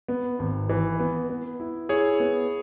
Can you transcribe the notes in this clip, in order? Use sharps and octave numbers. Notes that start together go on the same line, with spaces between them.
B3
G#1
E3
B3
B3
E4
E4 G#4 C#5
B3